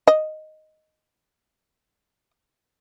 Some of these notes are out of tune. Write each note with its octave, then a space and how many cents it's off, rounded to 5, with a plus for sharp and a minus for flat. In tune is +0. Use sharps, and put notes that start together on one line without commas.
D#5 +0